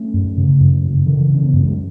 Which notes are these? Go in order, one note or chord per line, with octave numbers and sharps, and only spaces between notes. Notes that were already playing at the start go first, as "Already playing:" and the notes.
Already playing: A3 C#4
F#2
C#3
F#2
C#3
C#3 E3
C#3 C#4
B3
F#2 A3
G#3